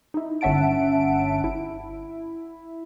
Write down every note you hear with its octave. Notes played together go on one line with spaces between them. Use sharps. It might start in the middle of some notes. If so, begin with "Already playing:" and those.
D#4 E4
G1 C#4 E5 F#5 A5 D7
E4